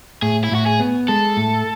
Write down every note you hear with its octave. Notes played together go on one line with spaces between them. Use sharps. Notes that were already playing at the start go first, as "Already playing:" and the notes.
A2 G#4
E4
A2 F#4
G#4
B3
G#3 A4
A2